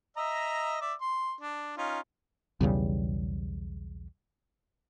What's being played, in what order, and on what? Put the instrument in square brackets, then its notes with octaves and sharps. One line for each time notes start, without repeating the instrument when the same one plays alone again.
[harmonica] D#5 E5 A#5
D5 E5
C6
D4
C#4 D#4 F4
[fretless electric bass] B1 E2 C#3 G3